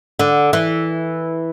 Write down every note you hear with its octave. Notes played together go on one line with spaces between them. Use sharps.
D3
E3